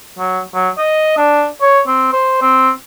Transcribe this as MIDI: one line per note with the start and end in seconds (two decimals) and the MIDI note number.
0.18 0.41 54
0.54 0.69 54
0.77 1.12 75
1.17 1.46 62
1.61 1.81 73
1.87 2.10 60
2.13 2.38 72
2.41 2.70 60